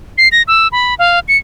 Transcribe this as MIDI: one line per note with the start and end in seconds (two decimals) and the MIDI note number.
0.18 0.28 96
0.32 0.43 94
0.48 0.68 88
0.72 0.95 83
0.99 1.20 77
1.28 1.37 97